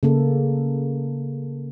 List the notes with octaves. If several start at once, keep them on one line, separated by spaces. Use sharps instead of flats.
C#3 A#3 A4